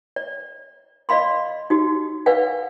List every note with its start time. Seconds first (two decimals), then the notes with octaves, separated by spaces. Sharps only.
0.16 D5
1.09 D5 D#5 F5 B5 C6
1.70 D#4 F#4 G4
2.26 B4 D5 F5 F#5 G#5